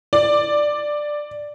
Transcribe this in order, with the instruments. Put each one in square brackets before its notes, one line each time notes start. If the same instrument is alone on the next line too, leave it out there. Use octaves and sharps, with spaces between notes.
[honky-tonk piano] D5